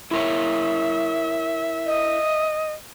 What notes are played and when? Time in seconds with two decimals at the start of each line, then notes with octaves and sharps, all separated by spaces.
0.11 E4 A#4 C#5 E5
1.86 D#5